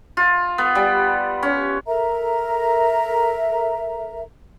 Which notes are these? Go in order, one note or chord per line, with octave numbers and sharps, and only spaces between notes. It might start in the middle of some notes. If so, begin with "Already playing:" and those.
F4
B3
G3
C#4
A4 A#4 E5 A#5